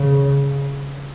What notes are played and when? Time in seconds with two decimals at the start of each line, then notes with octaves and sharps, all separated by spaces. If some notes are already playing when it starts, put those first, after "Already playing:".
Already playing: C#3